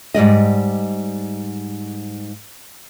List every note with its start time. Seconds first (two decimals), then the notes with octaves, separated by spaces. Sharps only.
0.14 G#2 G3 D5 D#5